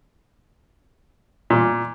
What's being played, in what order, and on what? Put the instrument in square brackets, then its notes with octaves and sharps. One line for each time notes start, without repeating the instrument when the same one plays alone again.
[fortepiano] A#2